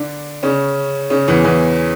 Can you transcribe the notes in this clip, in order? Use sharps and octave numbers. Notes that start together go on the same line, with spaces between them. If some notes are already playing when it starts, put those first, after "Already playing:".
Already playing: D3 D4
C#3 C#4
C#3 C#4
E2 E3
E2 E3